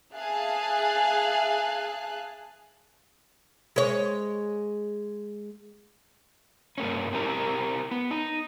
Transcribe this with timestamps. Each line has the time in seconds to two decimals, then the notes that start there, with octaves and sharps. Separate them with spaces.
0.14 G#4 E5 F5 G#5 A5 F#6
3.76 G#3 C#5
6.78 G2 A#3 C#4
7.13 C4 E4 G4 A#4
7.91 B3
8.11 D#4